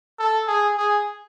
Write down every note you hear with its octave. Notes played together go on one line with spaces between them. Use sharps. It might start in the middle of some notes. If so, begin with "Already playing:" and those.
A4
G#4
G#4